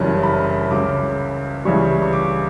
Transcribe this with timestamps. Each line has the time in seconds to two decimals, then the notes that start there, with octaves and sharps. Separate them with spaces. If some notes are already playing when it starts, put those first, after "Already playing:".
Already playing: F#1 F#2 E3 G3 C#4 A5
0.23 B5
0.71 C#2 C#3 F#3 D6
1.65 C#2 C#3 E3 G3 C#6
2.02 C#6
2.13 D6